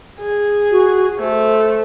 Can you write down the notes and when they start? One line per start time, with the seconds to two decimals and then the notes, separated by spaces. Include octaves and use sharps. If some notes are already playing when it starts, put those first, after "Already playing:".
0.20 G#4
0.72 F#4
1.19 A3 C5